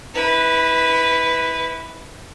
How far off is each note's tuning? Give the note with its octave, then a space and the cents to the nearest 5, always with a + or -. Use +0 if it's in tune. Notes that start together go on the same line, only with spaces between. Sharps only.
E4 -30 B4 +0